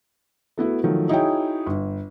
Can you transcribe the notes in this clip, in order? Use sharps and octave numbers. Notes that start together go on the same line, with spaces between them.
A3 B3 E4 F#4
D#3 F3 F#3 A3
D#4 E4 F#4 G#4 C#5 G5
G1